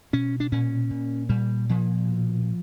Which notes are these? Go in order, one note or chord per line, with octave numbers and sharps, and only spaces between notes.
B2 C#4
D4
A#2 C#4
A#2
A#2 G3
A#2 F3
B2